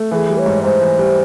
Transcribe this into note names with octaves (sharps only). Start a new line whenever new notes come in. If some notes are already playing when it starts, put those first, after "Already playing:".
Already playing: A3
E3 G#4 A4
G3
C#5
G#2
G#2 C5
E3
G3